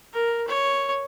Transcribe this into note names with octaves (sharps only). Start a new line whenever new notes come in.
A#4
C#5